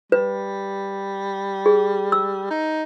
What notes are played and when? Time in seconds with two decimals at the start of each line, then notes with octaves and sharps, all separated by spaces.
0.12 G3 B4
1.66 G#4
2.12 E6
2.50 D#4